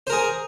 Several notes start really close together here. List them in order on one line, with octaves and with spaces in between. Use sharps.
C5 A#4 G#4